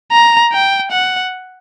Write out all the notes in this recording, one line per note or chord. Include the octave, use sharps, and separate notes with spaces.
A#5
G5
F#5